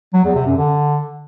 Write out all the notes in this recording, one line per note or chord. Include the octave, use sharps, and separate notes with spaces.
F#3
E2
C3
F#2
D3